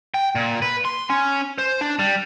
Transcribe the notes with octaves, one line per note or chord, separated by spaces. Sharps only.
G5
A#2
B4
C6
C#4
C5
D4
G3